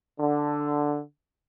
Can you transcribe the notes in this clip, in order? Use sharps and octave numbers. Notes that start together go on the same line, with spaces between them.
D3